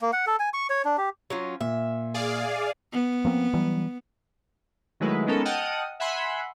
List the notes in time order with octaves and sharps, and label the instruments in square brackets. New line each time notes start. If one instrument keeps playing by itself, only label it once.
[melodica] A#3
F#5
A4
G#5
C#6
C#5
D4
G4
[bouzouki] F#3 C#4 F4
[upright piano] A#2 [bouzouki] E5
[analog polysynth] G#4 D5 F5
[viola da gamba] B3
[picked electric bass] F3 A#3 C4
E3 F#3 G3
[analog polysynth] D#3 F#3 G#3 A3 E4 B4
G#3 B3 C#4 D#4 A4 A#4
D#5 F#5 G5 A5 D#6 F6
E5 F#5 G#5 B5 C6